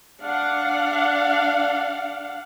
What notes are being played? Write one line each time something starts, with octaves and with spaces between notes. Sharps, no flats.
D4 F5 F#5